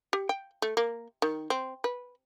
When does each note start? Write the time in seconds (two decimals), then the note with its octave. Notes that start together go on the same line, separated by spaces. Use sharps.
0.13 G4
0.29 G5
0.62 A3
0.77 A#3
1.22 D#3
1.50 C4
1.84 B4